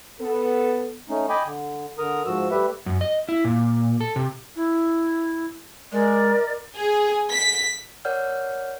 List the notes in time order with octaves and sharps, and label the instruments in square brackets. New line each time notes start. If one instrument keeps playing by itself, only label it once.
[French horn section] B3 A4
[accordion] A3 C#4 D#4
D#5 G5 G#5 B5 D6
D3
D3 A#4 A#5 D#6
G#2 F3 F#4 E6
G3 A3 G4 B4 E5
[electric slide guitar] F#2
D#5
E4
A#2
A4
C3
[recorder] E4
[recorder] G#3 [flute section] A#4 D5 D#5
[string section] G#4
B6
[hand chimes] A#4 C#5 D5 F#5 F6 G6